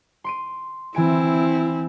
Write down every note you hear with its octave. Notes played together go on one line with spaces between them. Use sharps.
C6 D7 D#7
E3 C4 E4 G#5 D7